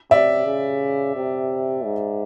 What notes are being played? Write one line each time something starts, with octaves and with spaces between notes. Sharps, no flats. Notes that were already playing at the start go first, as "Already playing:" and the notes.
C3 D5 E5
C#3
C3
G#2